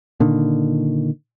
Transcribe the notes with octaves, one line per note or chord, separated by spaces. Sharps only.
A#2 D3 D#3